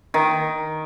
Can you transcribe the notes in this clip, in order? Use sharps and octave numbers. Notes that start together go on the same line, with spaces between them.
D#3